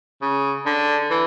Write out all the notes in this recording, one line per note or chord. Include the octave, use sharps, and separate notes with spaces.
C#3
D3
E3